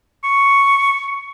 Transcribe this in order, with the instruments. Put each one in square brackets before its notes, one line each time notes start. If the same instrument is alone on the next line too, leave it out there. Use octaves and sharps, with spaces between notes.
[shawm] C#6